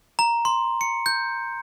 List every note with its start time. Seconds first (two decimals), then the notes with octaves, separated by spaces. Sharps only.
0.19 A#5
0.45 C6
0.81 C#7
1.06 G6